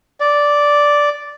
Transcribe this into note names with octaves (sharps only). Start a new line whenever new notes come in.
D5